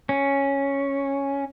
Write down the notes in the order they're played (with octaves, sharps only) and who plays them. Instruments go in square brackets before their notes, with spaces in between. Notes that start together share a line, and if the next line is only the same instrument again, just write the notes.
[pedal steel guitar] C#4